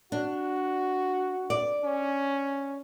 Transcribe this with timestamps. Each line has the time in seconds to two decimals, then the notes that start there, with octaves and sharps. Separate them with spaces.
0.12 D4 F#4
1.50 D5
1.84 C#4